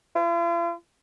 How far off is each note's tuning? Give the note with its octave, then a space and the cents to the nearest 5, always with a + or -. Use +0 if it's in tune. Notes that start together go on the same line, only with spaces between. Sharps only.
F4 -45